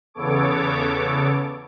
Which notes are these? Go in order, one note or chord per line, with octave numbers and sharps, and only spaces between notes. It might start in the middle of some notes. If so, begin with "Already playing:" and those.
E2 C#3 B3 A4 C#5 D6